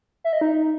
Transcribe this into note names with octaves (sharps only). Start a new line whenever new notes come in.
E5
D#5
D#4